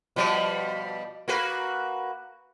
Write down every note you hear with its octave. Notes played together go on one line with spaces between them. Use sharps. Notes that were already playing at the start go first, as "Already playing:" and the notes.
B2 F3 G3
A#3 F#4 B4